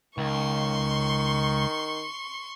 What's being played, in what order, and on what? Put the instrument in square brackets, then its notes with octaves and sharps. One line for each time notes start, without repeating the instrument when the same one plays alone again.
[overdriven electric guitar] C#2 [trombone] D#3 [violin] C6 C#6